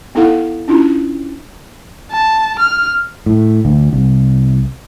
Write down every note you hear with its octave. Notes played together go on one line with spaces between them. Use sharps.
B3 D#4 E4 A4 F5 F#5
C#4 D4 E4 F4
A5
F6
A2
D2
C2